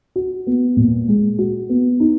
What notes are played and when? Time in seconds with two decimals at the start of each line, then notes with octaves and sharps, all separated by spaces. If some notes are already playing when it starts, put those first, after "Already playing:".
0.16 F#4
0.47 B3
0.77 A#2
1.08 G#3
1.39 F#4
1.69 B3
2.00 D#4